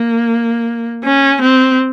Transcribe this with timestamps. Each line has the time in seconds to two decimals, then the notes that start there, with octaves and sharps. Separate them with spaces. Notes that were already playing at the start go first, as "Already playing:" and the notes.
Already playing: A#3
1.04 C#4
1.41 C4